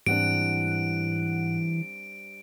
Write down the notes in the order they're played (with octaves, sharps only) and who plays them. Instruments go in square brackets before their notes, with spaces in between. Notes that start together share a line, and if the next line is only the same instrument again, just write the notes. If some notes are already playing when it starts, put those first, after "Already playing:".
[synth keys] G#2 F#5 F#6 [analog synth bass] E3 [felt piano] G3 C4 D4 [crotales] D7